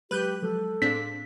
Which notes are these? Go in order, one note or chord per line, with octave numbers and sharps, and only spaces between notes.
F#3 G#3 G4 B4 F#6 G6
F3 F#3 G#3 A4
A2 C4 D4 G#4 F5 B6